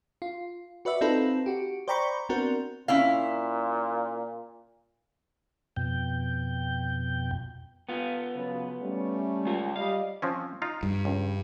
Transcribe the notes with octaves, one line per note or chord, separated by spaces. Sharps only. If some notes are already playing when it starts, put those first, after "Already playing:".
F4
F#4 B4 D5 E5
C4 D#4 F4 A4 B4
F#4 G4
C5 D5 G5 A#5 B5 C#6
B3 C4 D4 F#4 A#4 C5
A#2 C#4 E4 F5
F2 B2 G5
B3 F4
C#3 F#3 B4
G3 A3 C#4
G#3 F4
G3 D#5 F5
F3 C4 C#4
D#4 F4 F5
G2
C#2